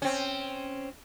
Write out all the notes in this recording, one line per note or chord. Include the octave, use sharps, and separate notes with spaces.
C4 C#4